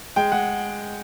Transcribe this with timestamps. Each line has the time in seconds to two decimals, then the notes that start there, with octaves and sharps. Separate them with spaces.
0.16 G#3 G5
0.32 G#3 F#5